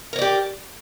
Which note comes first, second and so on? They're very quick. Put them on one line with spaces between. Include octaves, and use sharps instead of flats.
A#4 C#5 D5 G4